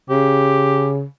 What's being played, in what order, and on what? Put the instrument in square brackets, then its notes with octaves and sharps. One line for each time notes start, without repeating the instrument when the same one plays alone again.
[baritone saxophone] C#3 [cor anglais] G4